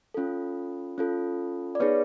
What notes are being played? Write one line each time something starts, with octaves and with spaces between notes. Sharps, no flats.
C#4 F4 A4
C#4 F4 A4
D5
B3 D#4 G#4 B4 C#5